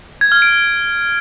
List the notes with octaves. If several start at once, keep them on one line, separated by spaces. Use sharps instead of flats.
G#6
F6
D7
G#6